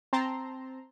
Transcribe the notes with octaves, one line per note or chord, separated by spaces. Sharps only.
C4 A5 A#5 C6